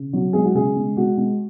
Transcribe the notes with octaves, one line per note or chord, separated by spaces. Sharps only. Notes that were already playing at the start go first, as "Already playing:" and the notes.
Already playing: C#3
F#3
G#3 G#4
F#4
C#3 G#4
G#3
G#3 F#4
G#3